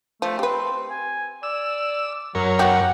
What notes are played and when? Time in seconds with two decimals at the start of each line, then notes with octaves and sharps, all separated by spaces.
0.22 F3 A3
0.39 C4 G4 B4
0.90 G#5
1.43 D5 E6
2.35 F#2 F#3 A#4 C#5
2.59 B3 F#4 G4 F#5